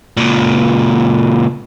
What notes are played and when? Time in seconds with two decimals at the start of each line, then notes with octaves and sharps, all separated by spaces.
0.17 C#2 A#2